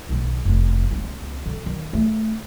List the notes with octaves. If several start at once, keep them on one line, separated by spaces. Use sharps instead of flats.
B1 D#3
F1
C#2 B3
D3
D#3
A3